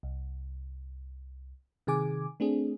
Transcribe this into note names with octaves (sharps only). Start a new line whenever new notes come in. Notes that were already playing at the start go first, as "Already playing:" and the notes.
C2
C3 D#3 G#4 G#5 D6
A3 C4 D4 G#4